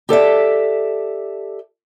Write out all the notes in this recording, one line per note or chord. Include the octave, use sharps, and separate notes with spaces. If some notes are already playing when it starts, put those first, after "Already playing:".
G4 A4 D5 E5